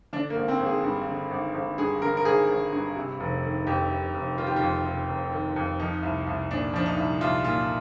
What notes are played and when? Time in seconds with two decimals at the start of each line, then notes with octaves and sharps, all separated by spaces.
0.13 D3 D4
0.30 A#3
0.36 G#1
0.48 C4
0.60 G#1
0.66 G#4
0.84 G2
1.07 D3
1.31 G#1
1.55 G#1
1.78 G2 G#4
2.01 D3 A#4
2.17 A#4
2.25 G#1 G#4
2.49 G#1
2.73 G2
2.96 C3
3.20 F1
3.44 D#3
3.67 F2 G4
3.91 C3
4.14 F1
4.37 D#3 F4
4.47 G4
4.56 F4
4.61 F2
4.85 C3
5.09 F1
5.32 D#3
5.56 F2
5.79 F3 D#4
6.03 C2
6.27 C2
6.51 A#2 D4
6.73 F3 D4
6.86 D#4
6.97 C2
7.21 C2 F4
7.44 A#2 F4